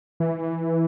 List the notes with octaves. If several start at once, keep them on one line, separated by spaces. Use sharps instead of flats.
E3